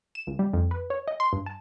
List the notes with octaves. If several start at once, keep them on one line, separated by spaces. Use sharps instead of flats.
E7
C#2
G3
F2
B4
C#5
D#5
C6
G2
A5